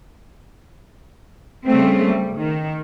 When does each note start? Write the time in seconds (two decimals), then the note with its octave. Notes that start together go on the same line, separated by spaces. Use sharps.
1.67 C#3 G3 A3 C4
2.04 G3
2.37 D#3